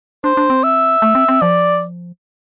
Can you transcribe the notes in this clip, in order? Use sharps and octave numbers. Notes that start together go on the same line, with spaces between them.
D4 C5
D4
C4
E5
A3
C4
C4
F3 D5